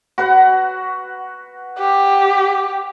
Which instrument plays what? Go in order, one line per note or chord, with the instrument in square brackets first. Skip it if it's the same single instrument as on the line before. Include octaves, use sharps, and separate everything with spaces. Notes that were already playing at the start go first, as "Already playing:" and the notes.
[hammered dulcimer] F#4 B4 F#5
[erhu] G4